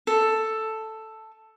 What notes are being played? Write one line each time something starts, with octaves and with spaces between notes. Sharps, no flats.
A4